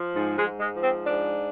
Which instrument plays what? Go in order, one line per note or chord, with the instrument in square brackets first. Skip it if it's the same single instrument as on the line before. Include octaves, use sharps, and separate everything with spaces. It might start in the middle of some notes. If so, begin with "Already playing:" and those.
Already playing: [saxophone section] F3
G#2
G#3
G#2
G#3
F3
C4
G#2 D4